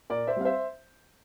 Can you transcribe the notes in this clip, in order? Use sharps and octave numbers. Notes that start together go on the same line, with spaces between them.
A#2 A#4 D5
C5 E5
G3 C4 F5
C5 E5